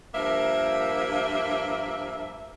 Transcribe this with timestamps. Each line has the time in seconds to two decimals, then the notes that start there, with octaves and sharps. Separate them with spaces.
0.14 G2 F3 A#3 A#4 E5